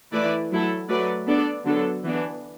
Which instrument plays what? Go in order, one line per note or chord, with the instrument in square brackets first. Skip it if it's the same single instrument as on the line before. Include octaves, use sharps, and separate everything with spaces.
[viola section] E3 A3 E4 B4 D5
F#3 A3 E4 A4
F#3 A3 F#4 B4 D5
B3 D4 A4 D5
D3 F#3 B3 D4 A4
E3 B3 D4